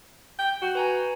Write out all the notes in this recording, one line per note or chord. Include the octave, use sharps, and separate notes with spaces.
G5
F#4
B4 G#5 A#5